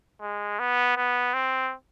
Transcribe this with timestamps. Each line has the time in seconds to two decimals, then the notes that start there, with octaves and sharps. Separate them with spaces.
0.21 G#3
0.59 B3
0.97 B3
1.34 C4